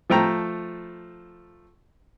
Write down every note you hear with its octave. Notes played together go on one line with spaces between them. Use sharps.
F3 A3 G5 A#5